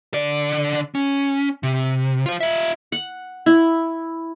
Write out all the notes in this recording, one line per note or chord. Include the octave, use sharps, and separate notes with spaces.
D3 D5
C#4
C3
F4 C5
F4 E5
F#5
E4